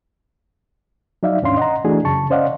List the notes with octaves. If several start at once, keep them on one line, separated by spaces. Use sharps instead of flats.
F#3 D#4 D5 E5 F5
D#2 G#2 C#4 D4 F5 C6
D#5 F#5 A#5
E3 A3 D4 E4 F#4 G#4
F#2 C#3 A5 C#6
C#4 C5 D5 D#5 F5 F#5